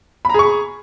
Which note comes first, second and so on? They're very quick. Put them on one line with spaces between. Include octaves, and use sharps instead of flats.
B5 A#5 G#4 C#6